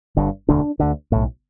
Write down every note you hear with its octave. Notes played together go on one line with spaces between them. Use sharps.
G1 G2 D3
E1 D2 D3 D4
D2 D3
B1 A2